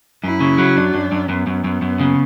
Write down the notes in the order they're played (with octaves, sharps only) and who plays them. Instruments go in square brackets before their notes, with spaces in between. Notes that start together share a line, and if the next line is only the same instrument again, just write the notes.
[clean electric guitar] F#2 [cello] E4
[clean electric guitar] C#3
F#3
[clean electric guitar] F#2 [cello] D4
[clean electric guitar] F#2
F#2
[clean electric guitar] F#2 [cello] B3
[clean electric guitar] F#2
F#2
F#2
C#3